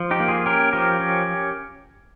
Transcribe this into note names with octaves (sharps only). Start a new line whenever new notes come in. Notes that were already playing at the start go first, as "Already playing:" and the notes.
Already playing: F3
D#4 G4
A#3
F4 G#4
C#4 G4 A#4
F3 G4 A#4
C#4